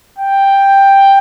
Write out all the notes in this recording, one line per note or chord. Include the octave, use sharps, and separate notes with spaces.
G5